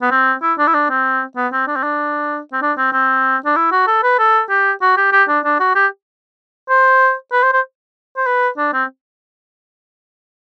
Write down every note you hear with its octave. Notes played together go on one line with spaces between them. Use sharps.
B3
C4
E4
D4
E4
D4
C4
B3
C4
D4
C4
D4
C4
D4
C4
C4
D4
E4
F#4
A4
B4
A4
G4
F#4
G4
G4
D4
D4
F#4
G4
C5
B4
C5
C5
C5
B4
D4
C4